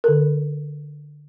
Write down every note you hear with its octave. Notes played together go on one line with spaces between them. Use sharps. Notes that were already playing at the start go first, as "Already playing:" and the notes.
D3 A4 A#4